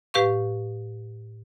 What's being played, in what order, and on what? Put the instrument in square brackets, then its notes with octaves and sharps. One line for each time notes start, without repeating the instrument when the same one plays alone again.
[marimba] A2 G4 B4 F5 C#6